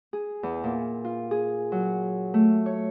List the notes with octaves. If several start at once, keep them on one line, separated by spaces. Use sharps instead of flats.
G#4
E2
A#2
F4
G#4
F#3
A3
C#5